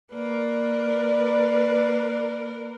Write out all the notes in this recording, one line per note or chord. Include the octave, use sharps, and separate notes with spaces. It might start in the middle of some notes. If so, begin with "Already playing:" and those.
A#3 A#4 B4 D5